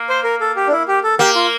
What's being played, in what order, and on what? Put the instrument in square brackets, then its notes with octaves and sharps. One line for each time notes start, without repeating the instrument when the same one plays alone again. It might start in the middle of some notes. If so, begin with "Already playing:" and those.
Already playing: [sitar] A#3
[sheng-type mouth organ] C5
A#4
A4
G4
D4
E4
G4
A4
[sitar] A#3 [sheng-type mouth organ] G4
[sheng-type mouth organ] F4